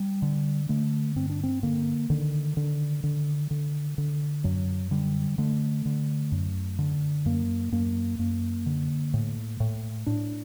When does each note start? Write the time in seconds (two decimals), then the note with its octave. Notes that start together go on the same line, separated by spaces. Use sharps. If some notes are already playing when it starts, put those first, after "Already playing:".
Already playing: G3
0.22 D3
0.69 D3 A3
1.16 G2 C4
1.30 D4
1.43 C4
1.63 D3 A#3
2.10 D3 D#3
2.57 D3
3.03 D3
3.51 D3
3.98 D3
4.44 F#2 F#3
4.91 D3 G3
5.38 D3 A3
5.85 D3
6.32 F#2
6.79 D3
7.26 F#2 A#3
7.72 F#2 A#3
8.19 F#2 A#3
8.66 D3
9.14 A2
9.60 A2
10.06 A2 D4